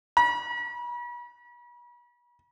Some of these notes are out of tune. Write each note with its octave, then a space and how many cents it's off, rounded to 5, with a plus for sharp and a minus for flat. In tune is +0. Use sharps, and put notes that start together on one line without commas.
B5 -40